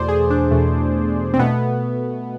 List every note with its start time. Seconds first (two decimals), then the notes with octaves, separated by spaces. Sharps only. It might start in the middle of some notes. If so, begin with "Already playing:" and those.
Already playing: E2 B2 A3 C5 D5
0.08 G#4
0.30 D4
0.51 E2 B2 A3
1.34 C4
1.39 B2 A3 B3